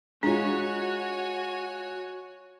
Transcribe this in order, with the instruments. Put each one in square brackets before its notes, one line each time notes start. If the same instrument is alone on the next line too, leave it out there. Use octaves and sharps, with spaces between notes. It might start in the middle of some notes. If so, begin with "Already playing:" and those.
[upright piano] G#3 F4 [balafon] D4 [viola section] F#4 [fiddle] C#5 G#5